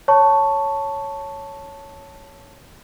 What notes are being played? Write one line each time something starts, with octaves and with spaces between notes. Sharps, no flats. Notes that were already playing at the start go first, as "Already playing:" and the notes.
C#5 A5 C#6